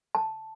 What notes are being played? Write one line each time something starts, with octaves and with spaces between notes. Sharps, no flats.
A5